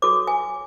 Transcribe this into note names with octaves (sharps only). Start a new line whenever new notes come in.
F#4 A4 C#5 D6
G#5